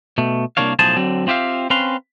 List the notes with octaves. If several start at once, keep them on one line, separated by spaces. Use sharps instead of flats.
B2 A3
C2 D3 A#3 D4 C#5 F5
B1 A2 F3 G#4 C5 A5
D3 F#3 C4
C4 F4 G4 E5 F5
C4 C#4 B4 F5 C6